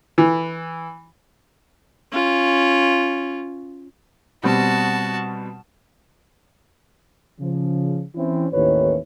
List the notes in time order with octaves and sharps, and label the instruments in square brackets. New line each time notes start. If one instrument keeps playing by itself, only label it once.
[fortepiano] E3
[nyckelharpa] C#4 F4
[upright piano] B2 G3 C4 [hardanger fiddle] F#4 A5
[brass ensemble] C#3 F3
E3 C4 C#4 E4
A1 D#2 D#3 E3 B4 C#5